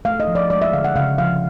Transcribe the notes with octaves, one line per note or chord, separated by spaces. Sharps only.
A3 F5
D#5
F3
D5
G#3 D5
E5
D3 F5
F#5
C#3 F5
F3 F5